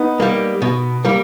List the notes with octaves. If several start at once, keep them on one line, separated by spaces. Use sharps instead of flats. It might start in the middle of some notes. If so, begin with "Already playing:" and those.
Already playing: B3 D#4
G3 A#3
B2
G3 A#3